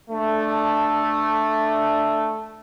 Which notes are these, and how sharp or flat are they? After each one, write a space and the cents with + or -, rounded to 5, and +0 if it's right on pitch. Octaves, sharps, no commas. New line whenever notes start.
A3 +0 D4 +10